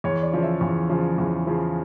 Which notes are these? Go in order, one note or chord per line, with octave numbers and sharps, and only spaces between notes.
E2 C#5
D5
C#3 F3
E5
E2
C#3 F3
E2
C#3 F3